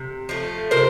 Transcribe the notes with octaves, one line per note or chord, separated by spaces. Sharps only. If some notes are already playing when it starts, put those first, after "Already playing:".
Already playing: C3
F3 A3
C3 A#4 C5